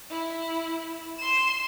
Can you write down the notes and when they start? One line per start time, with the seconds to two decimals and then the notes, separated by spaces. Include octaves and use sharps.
0.10 E4
1.18 C6 E7